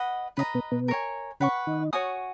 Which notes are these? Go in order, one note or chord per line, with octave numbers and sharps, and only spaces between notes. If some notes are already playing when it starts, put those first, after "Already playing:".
Already playing: B4 D#5 F#5
C#3 C#4 B4 D#5 A#5
B2 B3
B2 B3
A#4 C#5 G#5
C#3 C#4 B4 F#5 C#6
D#3 D#4
F#4 C#5 G#5 D#6